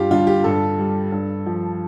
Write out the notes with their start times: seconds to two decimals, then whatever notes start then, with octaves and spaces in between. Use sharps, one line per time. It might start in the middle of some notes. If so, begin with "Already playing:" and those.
Already playing: G2 F4 G4
0.11 D3 G3 F4
0.27 G4
0.44 G2 A4
0.78 G3
1.12 G2
1.46 F3